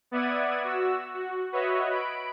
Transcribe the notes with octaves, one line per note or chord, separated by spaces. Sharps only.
B3 D5 E5 F#5 G#6 D#7
F#4 E6
F#4
F#4 B4 C#5 D#5 E5
B5 D7